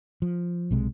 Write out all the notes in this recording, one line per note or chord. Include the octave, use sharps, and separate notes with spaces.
F3
B1 C3 G#3